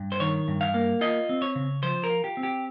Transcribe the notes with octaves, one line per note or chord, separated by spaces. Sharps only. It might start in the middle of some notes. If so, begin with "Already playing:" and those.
Already playing: G2
C5
D#3 C#5
G2
F5
A#3
F4 D#5
C4
C#5
C#3
F3 C5
A#4
F4
G4
C4
G4